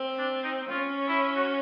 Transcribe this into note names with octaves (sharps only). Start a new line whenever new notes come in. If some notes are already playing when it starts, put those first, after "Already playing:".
Already playing: C4
D4
D#4
C#4 F4
E4
F#4